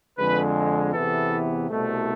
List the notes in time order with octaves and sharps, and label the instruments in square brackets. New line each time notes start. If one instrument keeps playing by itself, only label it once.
[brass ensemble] F2 D3 G#3 B4
E2 C3 E3 B3 A4
C2 B2 A3